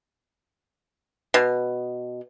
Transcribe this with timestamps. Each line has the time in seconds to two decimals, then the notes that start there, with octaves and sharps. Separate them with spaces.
1.34 B2